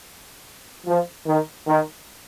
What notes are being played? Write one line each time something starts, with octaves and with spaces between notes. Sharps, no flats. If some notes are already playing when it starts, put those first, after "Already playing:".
F3
D#3
D#3